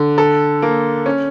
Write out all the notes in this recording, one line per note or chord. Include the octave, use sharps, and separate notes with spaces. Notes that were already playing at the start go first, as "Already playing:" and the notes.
Already playing: D3
A4
A#3
C#4